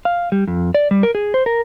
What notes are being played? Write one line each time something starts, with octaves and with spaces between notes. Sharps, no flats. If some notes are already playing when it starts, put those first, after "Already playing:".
F5
G3
F2
D5
G3
A#4
G#4
C5
A#4